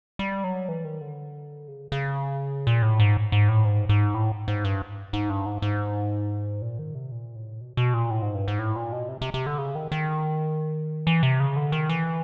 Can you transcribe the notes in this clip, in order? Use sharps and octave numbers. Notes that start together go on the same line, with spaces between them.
G3
F#3
E3
D#3
D3
C#3
C#3
A#2
A2
G#2
G#2
A2
G#2
G#2
A2
G#2
G2
G#2
G2
G#2
G#2
A#2
D#3
C3
A#2
A2
B2
B2
A#2
A2
G#2
G2
G#2
A2
A#2
B2
C3
C3
C3
D3
C#3
D#3
D#3
E3
C3
C#3
D3
D#3
E3